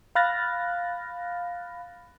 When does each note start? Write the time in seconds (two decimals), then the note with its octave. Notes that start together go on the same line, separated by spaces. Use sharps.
0.15 F5 B5 F6 F#6 A6 A#6